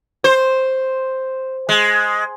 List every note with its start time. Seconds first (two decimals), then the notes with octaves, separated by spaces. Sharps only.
0.24 C5
1.69 G#3